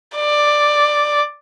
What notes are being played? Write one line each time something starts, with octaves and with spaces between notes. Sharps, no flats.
D5